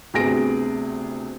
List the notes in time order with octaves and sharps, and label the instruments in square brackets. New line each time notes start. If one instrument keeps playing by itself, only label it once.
[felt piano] D2 C3 B3 G#4 A#6 D7